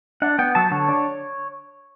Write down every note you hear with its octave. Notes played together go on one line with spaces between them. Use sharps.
D4 F#5
B3 G5
F#3 A5
D3 C#5
D4